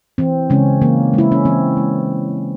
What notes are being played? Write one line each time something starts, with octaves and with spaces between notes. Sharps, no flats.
E3 C4
C#3 G#3 C#4
E3 A#3
G#3 E4
C#4
E3 C4
G#3